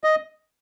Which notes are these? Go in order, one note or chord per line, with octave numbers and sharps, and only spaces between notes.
D#5